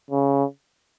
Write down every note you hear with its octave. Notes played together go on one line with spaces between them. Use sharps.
C#3